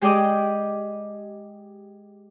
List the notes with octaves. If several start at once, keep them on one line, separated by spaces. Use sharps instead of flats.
G#3 G4 G#4 D5 D#5 D6